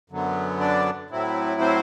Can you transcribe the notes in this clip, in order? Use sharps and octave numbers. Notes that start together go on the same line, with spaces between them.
F#2 D3 F#3 B3
D4 D5
A2 F#3 C4 E4
C4 C5